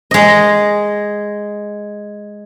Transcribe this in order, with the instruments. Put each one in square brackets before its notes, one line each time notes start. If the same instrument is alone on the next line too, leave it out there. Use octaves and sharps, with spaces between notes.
[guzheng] G#3 D#5